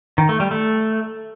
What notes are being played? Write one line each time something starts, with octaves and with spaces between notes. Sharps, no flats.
D#3
A3
G3
A3